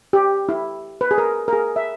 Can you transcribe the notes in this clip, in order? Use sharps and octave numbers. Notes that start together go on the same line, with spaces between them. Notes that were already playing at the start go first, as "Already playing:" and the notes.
G4
E4
B4
G#4
A#4
A#4
G#4
E5